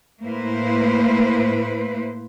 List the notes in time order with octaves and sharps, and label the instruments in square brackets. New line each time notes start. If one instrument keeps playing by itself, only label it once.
[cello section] A2 A#3 E4 B4 C5